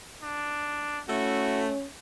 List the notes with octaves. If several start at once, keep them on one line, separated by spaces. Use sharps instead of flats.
D4
A3 C#4 E4 F#4